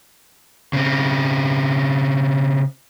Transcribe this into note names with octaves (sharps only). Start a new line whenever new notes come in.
C#3 C4